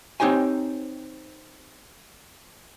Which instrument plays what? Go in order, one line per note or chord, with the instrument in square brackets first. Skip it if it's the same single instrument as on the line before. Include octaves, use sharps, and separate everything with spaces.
[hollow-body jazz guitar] C4 D#4 G4 C5 C#5 G#5